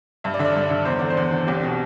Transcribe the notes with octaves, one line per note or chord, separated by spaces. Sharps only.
G2 E5
D5
D3 E5
D5
G2
D3
E2 C5
D3 D5
C5
E2
D3
C2 G4
B2